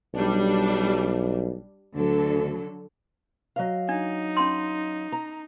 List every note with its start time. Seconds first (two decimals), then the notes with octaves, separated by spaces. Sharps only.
0.14 B1 G3 D4
1.95 D2 D3 F#3 A4
3.56 F#3 D#5 F5
3.89 D4 D#4
4.37 C#4 B5 C6
5.12 A#5